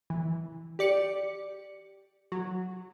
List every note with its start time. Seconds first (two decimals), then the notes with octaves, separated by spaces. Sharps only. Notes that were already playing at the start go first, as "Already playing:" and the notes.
0.10 E3
0.79 G4 D5 C#7
2.32 F#3